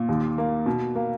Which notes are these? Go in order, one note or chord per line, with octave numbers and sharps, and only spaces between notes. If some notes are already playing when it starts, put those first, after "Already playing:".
Already playing: A#2
D#2
A#3
B2
A#3